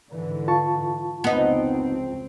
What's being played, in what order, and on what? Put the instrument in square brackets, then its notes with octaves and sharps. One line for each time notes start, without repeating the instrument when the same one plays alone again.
[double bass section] G#2 D3 E3
[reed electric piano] F4 A5 C#6
[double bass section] F1 C#2 C4 [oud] B3 D#4